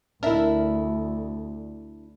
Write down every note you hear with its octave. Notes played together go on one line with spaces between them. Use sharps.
D2 D4 E4 A#4 E5